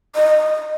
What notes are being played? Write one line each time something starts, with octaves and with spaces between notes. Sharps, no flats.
D#5